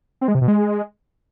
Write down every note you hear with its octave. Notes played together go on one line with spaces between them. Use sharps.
C4
G#3
C3
B2
G#3